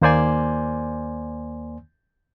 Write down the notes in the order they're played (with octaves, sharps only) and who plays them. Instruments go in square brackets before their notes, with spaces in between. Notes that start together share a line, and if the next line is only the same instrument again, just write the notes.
[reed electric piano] D#2 A#3 C5 D5 G#5 C6